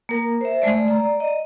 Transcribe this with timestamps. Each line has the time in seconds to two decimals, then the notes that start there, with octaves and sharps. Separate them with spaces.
0.09 A#3 A#4
0.41 C5 E5
0.62 G#3 A3 D5
0.88 D5 A#5
1.20 D#5